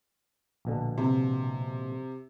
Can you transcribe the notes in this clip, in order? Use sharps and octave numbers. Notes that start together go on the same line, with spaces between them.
A#1 B2 D3
C3